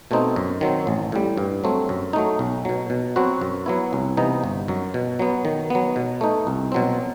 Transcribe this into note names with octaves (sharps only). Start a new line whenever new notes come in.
B2 A3 C4 D#4
F#2
D#3 F#3 C4
A1
A2 G3
G2
F#3 A3 C4
F#2
F#3 A3 D#4
B1
B2 F#3
B2
F#3 C4 F#4 B4
F#2
F#3 B3 E4
C2
C3 E3 B3 D#4
G1
F#2 F#3
B2
F#3 B3
D#3
F#3 B3
B2
A3 D#4
C2
B2 F#3 C4